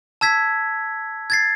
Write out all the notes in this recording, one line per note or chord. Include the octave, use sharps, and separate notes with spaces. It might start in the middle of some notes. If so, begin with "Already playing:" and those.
A5 E6 G#6 B6
G#6 A6 C7